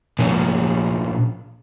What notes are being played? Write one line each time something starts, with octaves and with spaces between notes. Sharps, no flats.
A#2 F3 C#4